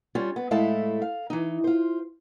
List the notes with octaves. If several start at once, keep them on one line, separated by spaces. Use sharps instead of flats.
G3 C#4 F4
B3
A2 G#3 A3 E4 F5 A5
F5
E3 D#4
F4 C5